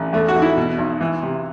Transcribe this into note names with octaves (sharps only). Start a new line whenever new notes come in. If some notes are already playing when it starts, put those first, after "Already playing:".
Already playing: A1
E2 A3
F#4
E2
E4
B2
B1
E3
C3